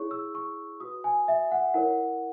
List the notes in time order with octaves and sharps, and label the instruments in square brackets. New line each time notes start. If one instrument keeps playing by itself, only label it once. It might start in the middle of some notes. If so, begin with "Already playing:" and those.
Already playing: [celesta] E4 G#4 C#5 C#6
E6
C#6
F#4 B4 D#6
G#5
E5
F#5
E4 A#4 C#5 F#5